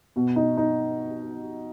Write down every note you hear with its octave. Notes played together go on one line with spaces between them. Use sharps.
B2
D#4
D#4